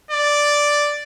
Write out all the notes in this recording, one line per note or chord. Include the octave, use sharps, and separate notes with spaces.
D5